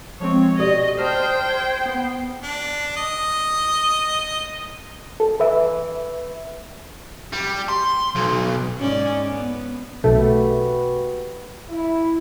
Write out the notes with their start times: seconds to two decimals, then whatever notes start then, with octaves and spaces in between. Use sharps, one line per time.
0.20 F3 G#3 C4 C#5
0.59 B2 G4 A4 D5 D#5
0.98 C5 G5 A5 D#6 F6
1.49 G#6
1.86 B3 C7
2.43 D4
2.96 D#5
5.20 A4
5.40 B4 E5
7.33 G3
7.68 C6
8.15 B1
8.79 G#2 C#4 D5
9.28 B3
10.04 B1 A3 F#4 G4 B4
11.70 E4